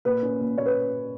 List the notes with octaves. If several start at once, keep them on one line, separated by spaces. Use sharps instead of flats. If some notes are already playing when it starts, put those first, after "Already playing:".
A#2 B4
C#4
A#2
A#2 C#5
B4